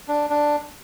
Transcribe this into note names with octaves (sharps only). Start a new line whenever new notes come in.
D4
D4